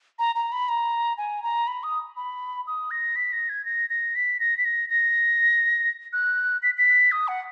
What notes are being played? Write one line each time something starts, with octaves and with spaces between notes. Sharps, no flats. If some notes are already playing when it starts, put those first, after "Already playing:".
A#5
A#5
B5
A#5
G#5
A#5
B5
D#6
B5
D#6
A#6
B6
A#6
G#6
A#6
A#6
B6
A#6
B6
A#6
A#6
F#6
B6
B6
D#6
F#5